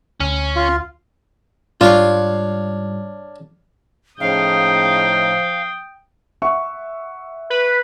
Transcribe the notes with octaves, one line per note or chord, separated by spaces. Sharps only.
D2 C#4
F4
G#2 G3 D4 F4 C#5 F5
A2 C#3 F3 D#4 F5 G5 D#6
E5 F#5 C#6
B4